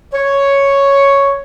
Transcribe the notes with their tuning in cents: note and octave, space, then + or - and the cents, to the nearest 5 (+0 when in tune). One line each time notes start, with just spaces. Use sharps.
C#5 +0